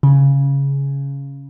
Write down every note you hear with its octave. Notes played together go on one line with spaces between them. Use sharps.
C#3